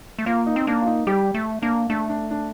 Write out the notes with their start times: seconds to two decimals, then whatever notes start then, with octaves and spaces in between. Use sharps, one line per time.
0.19 A3
0.26 A#3 F4
0.46 D#4
0.56 C4
0.67 A#3 D4
0.82 F4
0.86 D#4
1.07 G3 G4
1.34 A3
1.62 A#3 D4
1.89 A3 D4
2.09 D4
2.31 D4